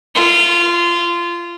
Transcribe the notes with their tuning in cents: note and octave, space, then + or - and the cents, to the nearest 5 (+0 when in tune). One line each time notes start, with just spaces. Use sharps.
F4 -20